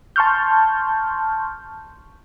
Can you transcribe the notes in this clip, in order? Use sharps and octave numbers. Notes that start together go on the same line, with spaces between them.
A5 C6 C#6 F6 G6